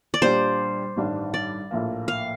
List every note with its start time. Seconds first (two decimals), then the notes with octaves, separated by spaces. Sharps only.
0.14 D5
0.22 A#2 G3 D4 G4 C5
0.96 A1 G2 D#3 G3 D4
1.34 D5
1.71 A#1 A2 F3 A#3
2.08 F5